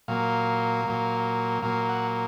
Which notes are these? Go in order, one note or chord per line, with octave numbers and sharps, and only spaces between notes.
A#2 F#3 A#3 F5
A#2 F#3 A#3
A#2 F#3 A#3 F5
F#5